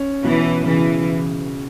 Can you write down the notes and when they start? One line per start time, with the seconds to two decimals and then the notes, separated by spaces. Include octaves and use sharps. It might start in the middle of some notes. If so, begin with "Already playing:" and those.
Already playing: C#4
0.24 B2 E3
0.67 C#3 E3